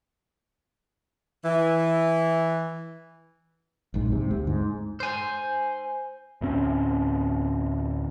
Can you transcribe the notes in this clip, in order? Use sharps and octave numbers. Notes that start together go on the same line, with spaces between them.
E3
A#1 G#2
G#2 C3
D2
G#2
C5 G#5
D2 A2 C4 C#4